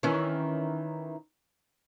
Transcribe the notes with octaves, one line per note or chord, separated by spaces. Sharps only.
D#3 E3 C#4